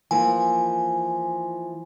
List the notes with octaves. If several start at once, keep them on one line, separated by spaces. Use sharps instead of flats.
E3 F3 A#3 G#5